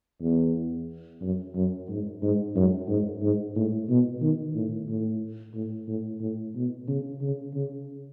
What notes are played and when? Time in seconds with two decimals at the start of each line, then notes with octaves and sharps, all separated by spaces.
0.22 E2
1.21 F#2
1.55 F#2
1.89 G#2
2.22 G#2
2.55 F#2
2.88 G#2
3.22 G#2
3.55 A2
3.89 B2
4.21 D#3
4.55 A2
4.89 A2
5.54 A2
5.88 A2
6.21 A2
6.55 B2
6.88 C#3
7.22 C#3
7.55 C#3